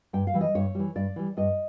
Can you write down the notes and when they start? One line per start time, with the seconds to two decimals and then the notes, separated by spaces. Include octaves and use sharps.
0.13 G2 G5
0.27 F5
0.34 E3 G3
0.41 D#5
0.55 G2 C#5
0.75 E3 G3
0.95 G2 D5
1.16 E3 G3
1.37 G2 D#5